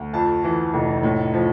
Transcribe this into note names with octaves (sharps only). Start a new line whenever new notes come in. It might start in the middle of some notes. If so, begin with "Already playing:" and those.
Already playing: D2
F2 A5
E3
F1
A2
F3